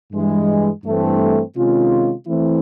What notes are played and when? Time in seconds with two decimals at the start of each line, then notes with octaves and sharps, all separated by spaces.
0.13 G2 E3 G#3
0.84 G2 E3 A3 C4
1.56 C3 D#3 G#3 C#4 F4
2.28 E3 A3 C4 E4